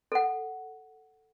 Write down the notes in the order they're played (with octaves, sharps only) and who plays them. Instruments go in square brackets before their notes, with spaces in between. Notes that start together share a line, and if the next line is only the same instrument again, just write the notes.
[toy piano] A4 F#5